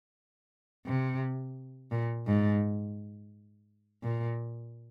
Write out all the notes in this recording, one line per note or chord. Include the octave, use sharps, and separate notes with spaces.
C3
A#2
G#2
A#2